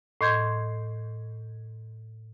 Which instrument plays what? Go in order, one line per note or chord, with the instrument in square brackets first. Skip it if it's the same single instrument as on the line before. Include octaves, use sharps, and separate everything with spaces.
[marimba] A2 D#5 C6 G6 G#6